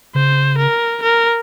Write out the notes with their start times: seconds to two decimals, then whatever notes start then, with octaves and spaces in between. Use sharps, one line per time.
0.15 C#3 C5
0.58 A#4
1.02 A#4